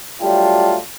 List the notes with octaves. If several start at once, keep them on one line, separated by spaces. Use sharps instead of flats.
F#3 G3 A3 D4 F4 G4